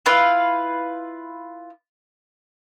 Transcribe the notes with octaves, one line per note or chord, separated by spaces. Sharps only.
E4 F4 B4 F5